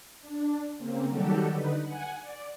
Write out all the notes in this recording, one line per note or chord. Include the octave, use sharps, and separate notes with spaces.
D4
C#3 A#3 C4
D#3 F#3 G3 F#4 G4 A4
D3 D#4 B4
F#5 G#5
D5